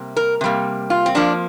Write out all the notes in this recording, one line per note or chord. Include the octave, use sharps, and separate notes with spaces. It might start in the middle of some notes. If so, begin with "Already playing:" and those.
Already playing: C3 G3 A#3
A#4
C3 G3 A#3
F4
C4
F2 F3 A#3 D4